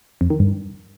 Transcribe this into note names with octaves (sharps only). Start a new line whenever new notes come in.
F2
D#3
G2